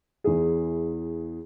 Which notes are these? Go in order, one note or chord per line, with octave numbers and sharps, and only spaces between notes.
E2 E4 G#4